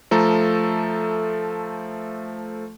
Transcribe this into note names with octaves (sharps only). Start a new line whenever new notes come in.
F3 A3 A4 A#5